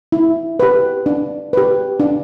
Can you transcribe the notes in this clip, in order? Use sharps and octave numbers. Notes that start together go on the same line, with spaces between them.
E4
G4 B4
D4
G4 B4
D4